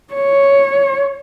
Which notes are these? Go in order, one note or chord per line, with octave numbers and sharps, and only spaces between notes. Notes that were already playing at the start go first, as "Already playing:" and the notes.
C#5